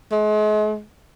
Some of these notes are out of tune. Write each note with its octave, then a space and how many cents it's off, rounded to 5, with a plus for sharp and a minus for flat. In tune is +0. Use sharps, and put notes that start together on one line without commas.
G#3 +40